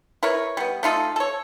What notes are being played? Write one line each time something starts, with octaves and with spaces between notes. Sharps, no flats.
E4 A#4 B4 C#5
G3 B3
A3 D#4 F4 A4
A4 C#5